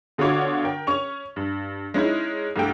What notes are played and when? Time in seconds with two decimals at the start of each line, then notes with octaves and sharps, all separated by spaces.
0.18 B2 D3 F4 F#4 C#5 D6
0.64 A#4 G5
0.87 C#4 C#6 F7
1.36 G2
1.94 G#3 C#4 D#4 E4
2.56 C2 G2 A3 G4 G5